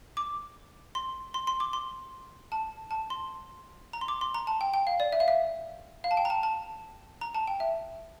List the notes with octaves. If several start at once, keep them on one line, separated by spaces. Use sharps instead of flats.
D6
C6
C6
C6
D6
C6
A5
A5
C6
A#5
C6
D6
C6
A#5
A5
G5
G5
F5
D5
E5
F5
E5
F5
A5
G5
A#5
A5
A5
A#5
A5
G5
E5